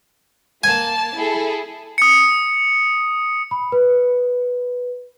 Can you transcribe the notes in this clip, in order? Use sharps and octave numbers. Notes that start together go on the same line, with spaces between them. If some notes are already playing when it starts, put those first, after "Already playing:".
A#3 G#5 A5
E4 G#4 A4
D#6 C#7
B5
B4